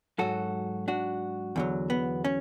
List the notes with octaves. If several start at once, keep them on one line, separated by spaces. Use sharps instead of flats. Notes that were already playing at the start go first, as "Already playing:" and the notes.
G#2 F#3 F#4 A4
D4 F#4
E2 D3 F#3
B3
C#4